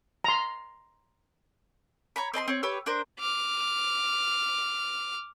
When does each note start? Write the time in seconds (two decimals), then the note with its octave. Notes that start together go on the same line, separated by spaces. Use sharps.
0.24 A#5 C6
2.16 C#5 A#5 B5
2.34 C4 D#5 A#5 C6
2.48 C4 C#5
2.63 G4 B4 C#5 E6
2.86 D4 A#4 C5
3.19 D6 F6